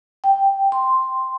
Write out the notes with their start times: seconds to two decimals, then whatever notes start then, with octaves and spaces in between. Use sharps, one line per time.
0.24 G5
0.72 C6